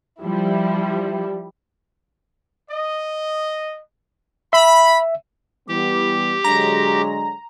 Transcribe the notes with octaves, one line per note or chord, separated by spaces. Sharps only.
F3 G3 E4
D#5
E5 B5
E3 G3 B3 G4
D3 F#3 G#3 A#5